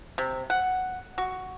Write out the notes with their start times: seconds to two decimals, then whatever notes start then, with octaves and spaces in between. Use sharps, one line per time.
0.18 C3
0.50 F#5
1.18 F#4